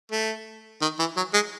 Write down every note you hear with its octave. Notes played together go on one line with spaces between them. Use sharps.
A3
D#3
E3
F#3
G#3